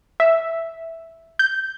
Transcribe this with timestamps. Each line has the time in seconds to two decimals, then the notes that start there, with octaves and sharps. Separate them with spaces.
0.20 E5
1.39 G6